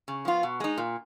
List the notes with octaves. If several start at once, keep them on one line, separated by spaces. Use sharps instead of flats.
C#3
F3 B3 F4
B2
G#3 D#4
A#2